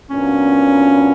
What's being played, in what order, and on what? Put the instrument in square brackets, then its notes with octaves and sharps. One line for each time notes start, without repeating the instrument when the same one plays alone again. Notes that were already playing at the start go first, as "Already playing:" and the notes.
[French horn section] A#2 F#3 B3 D4 [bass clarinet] C#4